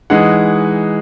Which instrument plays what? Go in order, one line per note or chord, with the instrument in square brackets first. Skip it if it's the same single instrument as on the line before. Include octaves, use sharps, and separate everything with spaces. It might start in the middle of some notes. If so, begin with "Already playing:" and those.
[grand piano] E3 G#3 D#4 F#5